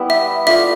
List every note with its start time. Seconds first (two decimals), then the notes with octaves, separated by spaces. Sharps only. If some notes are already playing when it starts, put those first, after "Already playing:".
Already playing: G3 B3 E4
0.10 E5
0.46 A3 D4 F4 E5